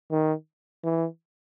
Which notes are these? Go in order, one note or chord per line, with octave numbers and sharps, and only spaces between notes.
D#3
E3